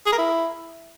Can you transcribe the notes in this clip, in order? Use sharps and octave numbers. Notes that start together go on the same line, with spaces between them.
G#4
A#4
E4